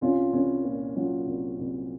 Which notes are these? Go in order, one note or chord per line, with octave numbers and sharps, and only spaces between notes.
C2 C#4 F4
C2 C#4
A#2
F#3 C#4 F4
C2
C2